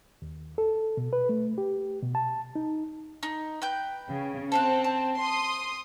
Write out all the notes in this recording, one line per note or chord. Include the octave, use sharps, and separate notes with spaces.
D#2
A4
B2
B4
A3
G4
B2
A5
D#4
D#4
B4 G5 G6
C#3
C4 A4 F5 F#6
A5
C6 D#6